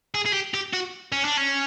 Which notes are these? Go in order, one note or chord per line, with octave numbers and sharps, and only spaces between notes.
G#4
G#4
G4
G4
F#4
C#4
D4
C#4